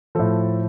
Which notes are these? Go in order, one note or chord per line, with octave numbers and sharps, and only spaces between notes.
A2 F3 A4